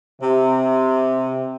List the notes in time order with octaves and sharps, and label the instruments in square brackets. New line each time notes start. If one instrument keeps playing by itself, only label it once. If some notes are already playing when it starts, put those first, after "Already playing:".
[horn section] C3